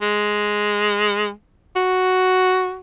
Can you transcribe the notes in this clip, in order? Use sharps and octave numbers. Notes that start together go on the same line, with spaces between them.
G#3
F#4